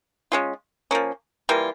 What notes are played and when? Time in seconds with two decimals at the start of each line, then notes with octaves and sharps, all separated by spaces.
0.32 G#3 C#4 F4
0.91 F3 A#3 C#4
1.49 E3 G3 A#3 F4